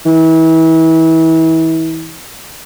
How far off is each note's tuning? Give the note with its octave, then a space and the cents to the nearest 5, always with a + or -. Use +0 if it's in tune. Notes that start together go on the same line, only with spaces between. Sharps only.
E3 -35